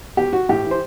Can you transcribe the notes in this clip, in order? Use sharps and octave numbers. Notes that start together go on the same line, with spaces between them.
B2 G4
F#4
A2 G4
E3
C5